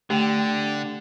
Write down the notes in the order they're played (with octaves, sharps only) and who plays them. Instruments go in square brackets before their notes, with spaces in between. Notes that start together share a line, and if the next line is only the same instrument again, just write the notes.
[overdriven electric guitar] D3 [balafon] A3 [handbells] G4 G5